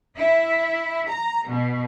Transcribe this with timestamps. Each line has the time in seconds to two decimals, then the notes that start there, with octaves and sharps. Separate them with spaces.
0.17 E4
1.10 A#5
1.48 B2